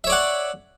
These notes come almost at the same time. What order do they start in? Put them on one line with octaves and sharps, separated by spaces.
E5 C#5 D5 F#5